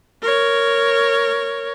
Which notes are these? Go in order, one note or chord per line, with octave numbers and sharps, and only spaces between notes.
A#4 C#5